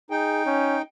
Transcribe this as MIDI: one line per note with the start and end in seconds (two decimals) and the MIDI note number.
0.11 0.82 63
0.11 0.41 68
0.11 0.82 79
0.46 0.78 61